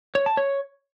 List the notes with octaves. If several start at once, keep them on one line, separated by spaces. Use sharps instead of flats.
C#5
A5
C#5